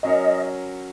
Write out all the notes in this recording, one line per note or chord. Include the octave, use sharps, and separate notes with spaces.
F#3 C#4 A#4 C#5 D#5